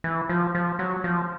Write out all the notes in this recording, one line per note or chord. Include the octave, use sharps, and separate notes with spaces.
E3
F3
F3
F#3
F3